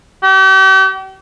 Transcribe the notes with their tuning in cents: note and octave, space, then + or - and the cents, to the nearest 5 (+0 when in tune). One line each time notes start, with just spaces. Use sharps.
G4 -40